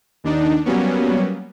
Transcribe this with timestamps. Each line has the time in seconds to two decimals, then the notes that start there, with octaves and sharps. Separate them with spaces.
0.24 D#2 D4 D#4
0.65 F#3 G3 A#3 B3 C#4